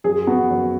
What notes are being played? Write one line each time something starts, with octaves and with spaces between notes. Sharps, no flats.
F#2 G#4
B3 F#4
F#2